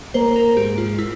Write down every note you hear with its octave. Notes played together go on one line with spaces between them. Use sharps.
A#3 C5
A#4
G#2 G4
F4
E4